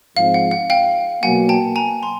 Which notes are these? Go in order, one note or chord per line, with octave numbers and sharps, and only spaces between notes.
G#2 F3 G#3 C4 F5
F#5
F#5
F5 G5
B2 F#3 A#3 F#5 G#5
G5 A5
G#5 A#5
A#5 C6